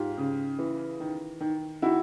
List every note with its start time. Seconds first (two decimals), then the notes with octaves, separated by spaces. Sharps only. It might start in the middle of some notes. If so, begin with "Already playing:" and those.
Already playing: G#2 F4 G4
0.18 C#3
0.59 E3
1.00 D#3
1.40 D#3
1.82 D#3 E4 F#4